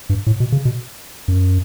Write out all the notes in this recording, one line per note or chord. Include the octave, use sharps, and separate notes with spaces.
G2
A2
B2
C#3
B2
F#2